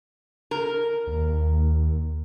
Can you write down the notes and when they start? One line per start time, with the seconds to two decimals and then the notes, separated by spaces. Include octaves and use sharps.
0.51 A#4
1.07 D#2